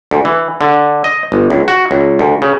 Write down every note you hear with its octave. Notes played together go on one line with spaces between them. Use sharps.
D2
E3
D3
D#5
G1
C#2
F#4
C#2
D2
C#3